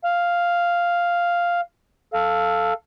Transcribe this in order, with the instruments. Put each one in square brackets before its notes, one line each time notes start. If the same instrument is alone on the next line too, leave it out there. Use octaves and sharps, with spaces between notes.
[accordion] F5
A4 F5